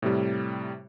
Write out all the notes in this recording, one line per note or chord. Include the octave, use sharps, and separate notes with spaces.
A2 C3 G3